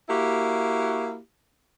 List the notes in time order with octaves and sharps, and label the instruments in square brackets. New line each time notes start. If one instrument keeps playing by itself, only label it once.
[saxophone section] A#3 E4 F#4 G4